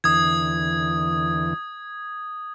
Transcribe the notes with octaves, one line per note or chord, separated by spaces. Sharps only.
E2 D3 E3 D#6 G#6